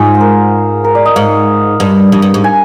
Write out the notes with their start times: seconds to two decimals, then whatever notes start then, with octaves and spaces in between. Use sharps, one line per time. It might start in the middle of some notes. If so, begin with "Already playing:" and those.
Already playing: G#2 F4 G#4
0.15 C5
0.20 A#4
0.84 A#4
0.95 D5
1.05 D#5
1.16 G#2 F5
1.80 G2
2.12 F2
2.22 G2
2.34 G#2
2.44 G#5